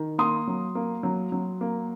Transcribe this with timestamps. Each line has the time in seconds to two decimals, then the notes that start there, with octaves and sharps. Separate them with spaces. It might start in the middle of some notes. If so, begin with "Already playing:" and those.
Already playing: D#3
0.18 A#3 C6 D#6
0.48 F#3
0.75 A#3
1.03 F#3
1.32 F#3
1.61 A#3